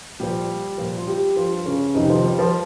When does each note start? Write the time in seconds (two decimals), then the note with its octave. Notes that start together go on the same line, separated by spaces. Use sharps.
0.20 A#2 F3 G3 G4
0.78 A#2 F3
0.98 F4
1.07 G3 G4
1.36 G2 F3 F4
1.66 C#3 C#4
1.95 F2 C3 D#3 F3 D#4
2.10 F3 F4
2.24 G3 G4
2.39 F3 F4